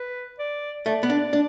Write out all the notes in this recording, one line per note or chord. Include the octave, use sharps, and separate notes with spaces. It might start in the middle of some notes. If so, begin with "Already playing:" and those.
Already playing: B4
D5
A3 D5
B3
D4
D4